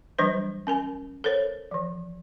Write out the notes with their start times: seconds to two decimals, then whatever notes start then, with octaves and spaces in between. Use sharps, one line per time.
0.18 E3 F#3 G3 D4 B4 C5
0.67 C#4 A#4 G#5
1.24 A4 A#4 C5 C#5
1.71 E3 F3